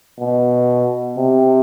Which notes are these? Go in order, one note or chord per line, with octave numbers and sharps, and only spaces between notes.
B2
C3